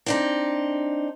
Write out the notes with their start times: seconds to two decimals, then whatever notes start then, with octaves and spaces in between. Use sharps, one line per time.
0.06 C4 D4 D#4